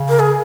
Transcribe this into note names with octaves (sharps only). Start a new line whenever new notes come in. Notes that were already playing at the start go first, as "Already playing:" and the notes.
Already playing: C#3
A#4
G#4